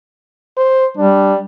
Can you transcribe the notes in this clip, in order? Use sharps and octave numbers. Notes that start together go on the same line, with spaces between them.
C5
G3 D4